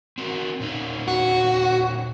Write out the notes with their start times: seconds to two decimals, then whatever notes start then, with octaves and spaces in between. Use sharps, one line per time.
0.18 C4 F#4 A#4
0.60 A#2 C#4 D#4
1.08 F#4